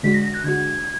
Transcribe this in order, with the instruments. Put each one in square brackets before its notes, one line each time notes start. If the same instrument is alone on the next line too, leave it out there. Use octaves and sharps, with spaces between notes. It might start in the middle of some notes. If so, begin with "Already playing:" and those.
[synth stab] D3 G#3 D4 F#4 [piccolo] B6
[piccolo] A#6
A#6
F#6
[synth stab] D3 G#3 D4 F#4 [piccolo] G#6